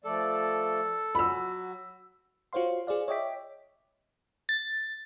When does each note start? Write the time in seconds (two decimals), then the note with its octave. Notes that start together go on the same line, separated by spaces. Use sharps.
0.04 F3 A3 A4 D5
1.15 F#3 F#4 B5 E6
2.53 F4 F#4 C5 C#5 F5 C6
2.87 F4 G#4 C5 D5 F5
3.08 C#5 D#5 E5 G5 D6 B6
4.49 A6